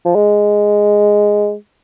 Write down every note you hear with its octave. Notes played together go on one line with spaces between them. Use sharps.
F3
G#3